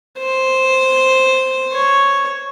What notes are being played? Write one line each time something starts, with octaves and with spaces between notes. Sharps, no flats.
C5
C#5